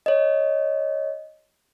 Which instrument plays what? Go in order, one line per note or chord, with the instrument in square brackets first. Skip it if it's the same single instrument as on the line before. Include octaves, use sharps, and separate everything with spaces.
[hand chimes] C#5 D#5